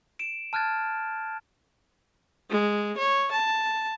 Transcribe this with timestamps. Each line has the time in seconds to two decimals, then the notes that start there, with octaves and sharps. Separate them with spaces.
0.19 D7 E7
0.53 A5 F6 F#6 G#6 A6
2.51 G#3
2.98 C#5
3.32 A5